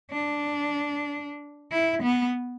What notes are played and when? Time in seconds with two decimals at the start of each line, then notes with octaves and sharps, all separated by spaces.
0.11 D4
1.72 E4
2.03 B3